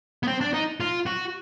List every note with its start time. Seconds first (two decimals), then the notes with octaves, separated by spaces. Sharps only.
0.23 B3
0.28 C4
0.41 D4
0.54 D#4
0.80 F4
1.06 F#4